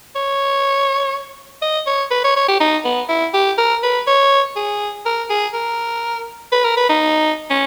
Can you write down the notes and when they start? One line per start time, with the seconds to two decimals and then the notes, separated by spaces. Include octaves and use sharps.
0.16 C#5
1.62 D#5
1.87 C#5
2.11 B4
2.24 C#5
2.36 C#5
2.48 G4
2.60 D#4
2.85 B3
3.09 E4
3.34 G4
3.58 A#4
3.83 B4
4.07 C#5
4.56 G#4
5.06 A#4
5.30 G#4
5.54 A#4
6.52 B4
6.64 A#4
6.77 B4
6.90 D#4
7.50 C#4